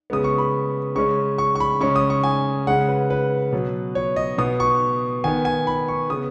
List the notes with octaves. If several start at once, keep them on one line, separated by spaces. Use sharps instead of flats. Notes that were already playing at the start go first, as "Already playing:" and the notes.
C#3 G#3 B3 D#6
C#6
B5
C#3 G#3 C#4 C#6
C#6
C#6
B5
C#3 G#3 C#4 C#6
D#6
C#6
G#5
C#3 G#3 C#4 F#5
B4
B4
B2 F#3 B3
C#5
D#5
B2 B3 D#6
C#6
D#3 B3 G#5
G#5
B5
C#6
C#3 B3 D#6